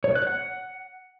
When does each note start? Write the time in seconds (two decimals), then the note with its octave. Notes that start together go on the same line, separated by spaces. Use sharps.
0.04 C#5
0.15 F#6
0.27 F#5